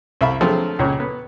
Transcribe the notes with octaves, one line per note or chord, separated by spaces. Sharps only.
C2 E5 F5 B5
D3 F3 F#3 G#3 A3 C4
C#2 A#2 C#3 C#5
B3